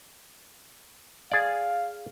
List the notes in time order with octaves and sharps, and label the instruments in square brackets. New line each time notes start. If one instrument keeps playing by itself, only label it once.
[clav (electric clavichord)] G#4 D5 [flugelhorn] F5